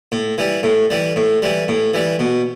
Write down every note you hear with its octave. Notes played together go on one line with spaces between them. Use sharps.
A2
E3 G3
A2
E3 G3
A2
E3 G3
A2
E3 G3
B2